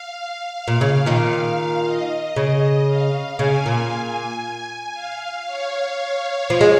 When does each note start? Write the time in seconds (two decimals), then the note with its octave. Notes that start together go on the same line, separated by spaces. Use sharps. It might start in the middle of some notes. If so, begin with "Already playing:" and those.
Already playing: F5
0.68 A#2
0.80 C#3 F5
1.06 A#2 D#3
1.84 D#5
2.36 C#3
2.87 F5
3.39 C#3 G#5
3.66 A#2
4.43 G#5
4.94 F5
5.46 C#5
6.50 F3
6.61 G#3